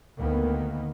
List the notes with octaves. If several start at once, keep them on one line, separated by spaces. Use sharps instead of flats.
D2 D#3 A#3 B3